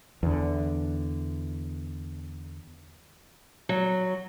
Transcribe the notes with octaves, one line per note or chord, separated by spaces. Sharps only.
E2 D3
F#3